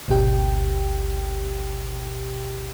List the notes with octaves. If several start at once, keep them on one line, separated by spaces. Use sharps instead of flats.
G#1 D2 B2 G4 G5